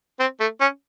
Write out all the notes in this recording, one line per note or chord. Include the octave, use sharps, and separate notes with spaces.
C4
A3
C#4